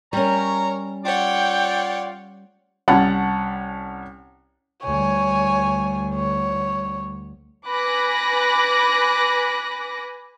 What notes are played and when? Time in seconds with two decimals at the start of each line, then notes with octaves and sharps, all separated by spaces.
0.13 G3 C#4 A#4 C#5 A#5
1.05 F4 C#5 D5 F#5 G5
2.88 C2 C#4 F#5 A5
4.84 D2 G3 C#5 G#5
6.14 C#5
7.67 B4 G#5 B5 D6 F#6 A#6